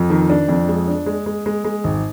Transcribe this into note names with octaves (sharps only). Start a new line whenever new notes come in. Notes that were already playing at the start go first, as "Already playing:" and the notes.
Already playing: F2
D#3
D4
F2
G#3
D4
G#3
G#3
G#3
G#3
G#1